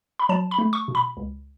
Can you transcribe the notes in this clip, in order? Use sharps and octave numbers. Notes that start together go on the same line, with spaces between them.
B5
F#3 A5
B5
A3
C#6
B2
B5
C#2